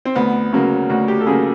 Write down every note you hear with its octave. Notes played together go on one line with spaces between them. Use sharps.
C4
D2 B3
C#3 F#3 A#3
D2 F#4
G4
A4
C#3 F#3 A#3 G#4